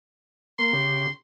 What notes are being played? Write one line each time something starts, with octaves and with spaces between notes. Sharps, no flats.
A#3 C6
C#3 G4